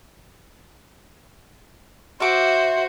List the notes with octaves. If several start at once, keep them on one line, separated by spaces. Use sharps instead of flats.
F#4 C5 E5 D6